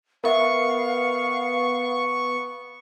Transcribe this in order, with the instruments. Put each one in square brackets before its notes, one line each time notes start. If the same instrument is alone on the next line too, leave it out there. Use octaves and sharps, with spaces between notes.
[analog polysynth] B3 C#6 [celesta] A#4 E5 [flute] F5